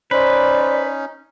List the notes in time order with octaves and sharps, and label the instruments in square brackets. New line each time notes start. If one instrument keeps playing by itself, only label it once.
[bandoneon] C#4 D#4 [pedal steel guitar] B4 [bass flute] C5 [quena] D5